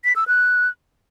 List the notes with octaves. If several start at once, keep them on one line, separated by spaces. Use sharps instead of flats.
B6
E6
F#6